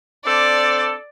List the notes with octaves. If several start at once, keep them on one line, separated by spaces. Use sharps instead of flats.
C4 D4 A4 D5